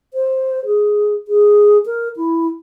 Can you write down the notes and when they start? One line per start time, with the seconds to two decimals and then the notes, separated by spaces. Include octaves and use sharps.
0.14 C5
0.65 G#4
1.28 G#4
1.86 A#4
2.16 E4